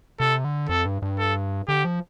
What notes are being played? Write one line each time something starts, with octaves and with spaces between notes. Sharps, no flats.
C3 A4
D3
F2 A4
G2
G2
A4
D3 G4
F3